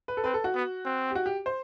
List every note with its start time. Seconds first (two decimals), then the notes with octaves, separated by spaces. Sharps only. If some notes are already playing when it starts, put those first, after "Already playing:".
0.08 B4
0.17 A4
0.24 C4 B4
0.34 A4
0.44 F#4
0.54 B3
0.85 C4
1.11 G4
1.15 F#4
1.26 G4
1.46 C5